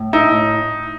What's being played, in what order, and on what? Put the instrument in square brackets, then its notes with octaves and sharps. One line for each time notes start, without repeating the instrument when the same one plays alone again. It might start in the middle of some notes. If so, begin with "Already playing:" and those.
Already playing: [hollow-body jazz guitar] A2
[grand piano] D#4 [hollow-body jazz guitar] E4
[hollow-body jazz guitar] A2